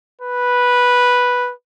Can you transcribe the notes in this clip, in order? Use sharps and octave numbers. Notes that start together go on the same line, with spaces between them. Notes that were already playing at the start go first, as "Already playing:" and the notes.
B4